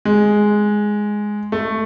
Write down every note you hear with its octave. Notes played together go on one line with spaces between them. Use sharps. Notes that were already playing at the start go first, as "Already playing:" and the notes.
G#3
A3